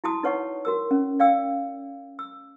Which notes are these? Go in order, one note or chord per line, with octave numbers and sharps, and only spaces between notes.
E4 F#4 A5 D#6
D#4 B4 C#5 F#5 C#6
F#4 A#4 E6
C#4
D5 F5 G5 E6
E6